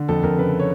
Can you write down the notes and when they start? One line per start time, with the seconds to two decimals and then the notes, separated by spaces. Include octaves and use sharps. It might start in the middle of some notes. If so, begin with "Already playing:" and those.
Already playing: D3
0.09 F2 A4
0.23 F2 A#4
0.38 C#3 B4
0.60 C#5